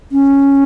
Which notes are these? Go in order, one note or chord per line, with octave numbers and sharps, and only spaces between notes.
C#4